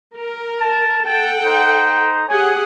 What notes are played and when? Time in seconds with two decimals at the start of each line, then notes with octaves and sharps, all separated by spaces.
0.16 A#4
0.60 A5
1.05 A4 F#5 G5 A5
1.45 D#4 C5 A#5
2.29 G4 G#4 C#5 F#5 G#5